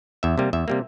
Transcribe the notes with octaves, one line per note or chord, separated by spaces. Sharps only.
E2 E5
C3 G3 A#3
E2 E5
C3 G3 A#3